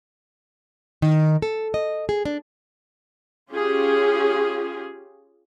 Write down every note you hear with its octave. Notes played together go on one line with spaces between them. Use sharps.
D#3
A4
D#5
G#4
D4
C#4 F4 G4 G#4